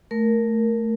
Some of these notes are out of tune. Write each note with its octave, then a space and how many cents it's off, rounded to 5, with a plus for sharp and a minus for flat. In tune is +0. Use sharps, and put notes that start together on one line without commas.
A3 +0 A#4 +0